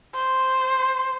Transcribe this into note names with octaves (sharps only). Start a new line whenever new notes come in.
C5